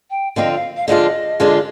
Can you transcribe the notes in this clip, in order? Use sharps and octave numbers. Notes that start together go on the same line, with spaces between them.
G5
D3 F3 C4 F4 D#5
F5
F5
D3 F3 G#3 D4 F4 D#5
D3 F3 G#3 D4 F4